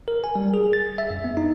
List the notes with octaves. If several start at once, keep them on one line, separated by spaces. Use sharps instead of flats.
A#4
G#5
G3
G#4
A6
E5
F#2
B3
D#4